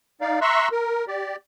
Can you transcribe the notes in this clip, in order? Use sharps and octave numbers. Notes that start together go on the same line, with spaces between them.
D#4 D5 F5
E5 A#5 C6 C#6 E6 F#6
A#4
G4 D5